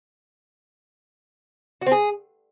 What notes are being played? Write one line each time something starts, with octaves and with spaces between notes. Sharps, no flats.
F#4
C4
G#4